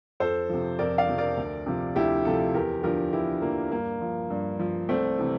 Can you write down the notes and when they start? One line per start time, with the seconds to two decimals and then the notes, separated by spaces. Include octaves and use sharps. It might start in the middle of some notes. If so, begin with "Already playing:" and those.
0.20 F2 A4 C5
0.49 C3 F3
0.79 F2 A#4 D5
0.98 D5 F5
1.08 C3 F3
1.18 A#4 D5
1.37 D2
1.66 C3 F3
1.96 D2 E4 G4
2.25 C3 F3 F4 A4
2.54 E2 G4 A#4
2.83 D3 F3 G4 A#4
3.13 E2 E4 G4
3.42 D3 F3 A#3
3.71 G2 A#3
4.01 F3
4.30 G2
4.60 F3
4.89 C2 A3 C4
5.18 C3 E3